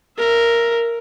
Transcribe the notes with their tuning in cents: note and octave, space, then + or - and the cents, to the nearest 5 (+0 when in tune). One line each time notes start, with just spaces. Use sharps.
A#4 +0 E5 +15